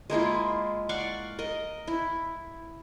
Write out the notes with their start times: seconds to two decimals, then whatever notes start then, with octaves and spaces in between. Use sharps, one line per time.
0.10 G#3 A#3 E4 F4
0.89 D5 F5 F#5 C#6
1.39 A#4 D#5
1.87 E4